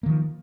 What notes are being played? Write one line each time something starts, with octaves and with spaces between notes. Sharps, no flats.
D#3 F3 A#3